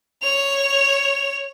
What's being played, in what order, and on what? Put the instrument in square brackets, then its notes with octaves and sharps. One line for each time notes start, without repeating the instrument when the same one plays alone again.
[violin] C#5 F7